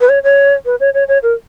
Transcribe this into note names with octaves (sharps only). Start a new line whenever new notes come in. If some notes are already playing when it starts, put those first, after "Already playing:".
B4
C#5
C#5
B4
C#5
C#5
C#5
A#4